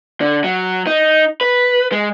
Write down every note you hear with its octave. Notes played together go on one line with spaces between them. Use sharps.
D3
F#3
D#4
B4
G#3